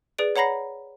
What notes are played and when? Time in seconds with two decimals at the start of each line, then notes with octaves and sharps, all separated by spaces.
0.19 G#4 B4 D5 D7
0.36 C#5 F#5 A#5 B5 A#6 C7